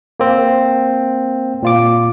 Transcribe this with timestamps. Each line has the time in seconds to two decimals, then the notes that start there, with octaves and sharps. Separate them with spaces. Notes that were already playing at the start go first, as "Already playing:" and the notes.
0.20 A#3 C4
1.62 A#2 F4 D6